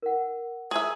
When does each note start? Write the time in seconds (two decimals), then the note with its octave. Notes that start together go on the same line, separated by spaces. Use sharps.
0.02 A#4 F#5
0.71 G#4 E5 G#5 A#5